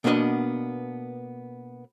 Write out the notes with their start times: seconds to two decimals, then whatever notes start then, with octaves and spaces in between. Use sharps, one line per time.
0.04 B2 A#3 B3 D4 B4 D#5